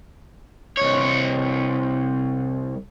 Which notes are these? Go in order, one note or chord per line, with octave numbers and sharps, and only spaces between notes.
C2 C#5